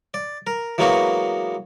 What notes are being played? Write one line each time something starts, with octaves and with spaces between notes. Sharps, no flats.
D5
A#4
E3 F#3 G#3 A#3 B3 F#4